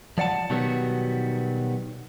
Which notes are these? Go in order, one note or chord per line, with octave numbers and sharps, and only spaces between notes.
F3 D5 F#5 A5
B2 D#3 F#3 G3 B3 F#4